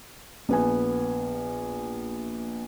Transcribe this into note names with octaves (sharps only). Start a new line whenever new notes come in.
A#1 B3 G#5